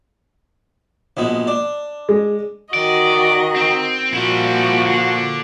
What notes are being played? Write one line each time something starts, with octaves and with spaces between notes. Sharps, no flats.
A#1 B2 G#3
D4
G#3
D#3 F#4 D5 D#5
C4
A#2 F3 G3 E4 F#4
D3